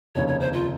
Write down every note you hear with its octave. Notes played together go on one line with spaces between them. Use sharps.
F1 D#2 C#3 C#5
C#5
C5
F4